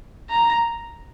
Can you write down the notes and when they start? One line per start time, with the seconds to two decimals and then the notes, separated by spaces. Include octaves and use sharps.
0.30 A#5